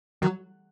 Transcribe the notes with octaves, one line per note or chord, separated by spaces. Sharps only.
D#3 F#3